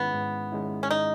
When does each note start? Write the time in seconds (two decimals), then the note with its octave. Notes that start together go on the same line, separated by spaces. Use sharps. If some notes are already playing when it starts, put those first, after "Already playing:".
Already playing: G#2 D#3 G#3 B3 C#4 E4
0.14 G#2
0.52 D#3 G#3 C#4 E4
0.83 C#4
0.91 D#4